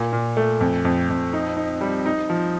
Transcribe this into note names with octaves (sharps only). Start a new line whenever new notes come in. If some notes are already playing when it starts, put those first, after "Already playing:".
Already playing: A#2
A#2
A3
F2
F2
F2
D#4
D#4
G3
D#4
F3